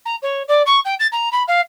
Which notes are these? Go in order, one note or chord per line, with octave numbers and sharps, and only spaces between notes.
A#5
C#5
D5
C#6
G5
A6
A#5
B5
F5